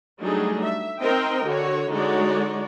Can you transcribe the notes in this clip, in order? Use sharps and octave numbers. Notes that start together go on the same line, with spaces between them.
F#3 G3 A3 D4 D#4 G#4
E5
C4 D#4 A#4 C5 D#5 G5
D3 F#4 C#5
D3 G#3 D#4 F#4 C#5 D5